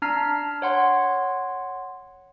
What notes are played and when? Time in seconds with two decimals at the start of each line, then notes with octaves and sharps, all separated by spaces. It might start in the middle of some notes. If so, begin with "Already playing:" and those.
0.02 D4 A5 A#5 F6 B6 C7
0.62 C#5 F#5 C6